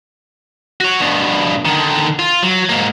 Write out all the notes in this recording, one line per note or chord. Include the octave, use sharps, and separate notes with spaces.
F#4 C#5
G2 B2
D3 D#3
F4
F#3
G#2 A#3